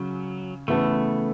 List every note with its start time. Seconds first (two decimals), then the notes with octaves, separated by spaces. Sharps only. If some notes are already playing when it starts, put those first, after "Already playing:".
Already playing: C#3 F#3 C#4
0.68 C#3 E3 A3 B3 A4